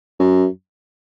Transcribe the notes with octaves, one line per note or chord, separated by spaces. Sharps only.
F#2